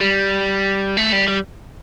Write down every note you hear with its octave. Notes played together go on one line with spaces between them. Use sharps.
G3
A3
G3
G3